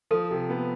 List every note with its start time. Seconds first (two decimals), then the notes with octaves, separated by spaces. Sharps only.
0.11 F3 A4
0.31 C3
0.50 B3